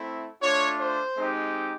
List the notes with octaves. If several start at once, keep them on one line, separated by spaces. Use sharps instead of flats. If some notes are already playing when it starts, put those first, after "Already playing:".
Already playing: A3 C4 E4
A3 D4 F4 C#5
C5
G#3 C4 D#4 G4